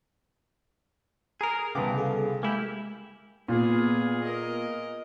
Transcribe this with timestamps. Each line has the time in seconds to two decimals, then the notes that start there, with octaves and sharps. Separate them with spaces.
1.41 G#4 A#4 A#5 D#6
1.75 C2 C#3 B3 G5 A5 D6
1.96 G#4 A4 F5
2.43 G#3 A#3 E4 G4 G#5
3.48 A#2 B3 G#4
4.23 A#4 D#5